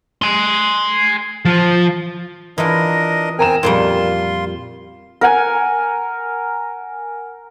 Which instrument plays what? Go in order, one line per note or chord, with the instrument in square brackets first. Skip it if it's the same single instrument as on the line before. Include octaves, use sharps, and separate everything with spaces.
[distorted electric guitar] G#5 C6
F3
[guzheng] E3 F4 [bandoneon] D4 A#4 D#5
[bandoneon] C4 G#5 [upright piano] A#4 A#5 E7
[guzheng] F2 A#2 G3 [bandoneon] F4 C6 [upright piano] A#4
[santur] A#4 F#5 G#5